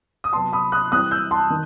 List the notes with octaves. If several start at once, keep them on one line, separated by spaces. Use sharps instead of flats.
D#6
C3 F#3 B3 A5 C6
B5 D#6
D#6 F#6
E3 G3 C4 D#6 F#6
E6 G6
A5 C6
D#3